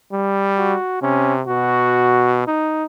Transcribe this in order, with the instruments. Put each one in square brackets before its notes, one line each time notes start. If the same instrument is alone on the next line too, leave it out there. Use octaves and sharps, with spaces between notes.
[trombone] G3
[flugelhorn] F#4
[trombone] C3 [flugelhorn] C#4
[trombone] B2 [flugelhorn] F#4
[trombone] D#4